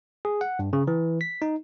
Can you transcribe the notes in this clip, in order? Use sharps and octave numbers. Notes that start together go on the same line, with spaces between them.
G#4
F#5
G2
C#3
E3
B6
D#4